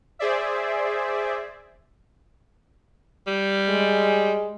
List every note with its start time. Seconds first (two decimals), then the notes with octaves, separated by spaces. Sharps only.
0.19 G#4 C5 D5 E5
3.27 G3
3.69 G#3